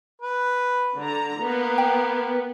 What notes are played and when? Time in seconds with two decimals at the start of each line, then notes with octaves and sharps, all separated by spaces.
0.22 B4
0.97 D3 A#5
1.40 A#3 B3
1.78 G5